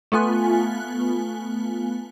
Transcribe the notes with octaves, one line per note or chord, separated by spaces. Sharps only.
A3 B3 F4 G#5 F#6